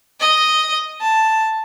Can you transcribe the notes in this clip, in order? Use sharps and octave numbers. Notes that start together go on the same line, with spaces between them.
D#5
A5